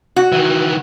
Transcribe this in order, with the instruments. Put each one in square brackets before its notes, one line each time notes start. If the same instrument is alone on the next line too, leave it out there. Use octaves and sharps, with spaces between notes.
[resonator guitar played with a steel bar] F#4
[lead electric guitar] D#3 E3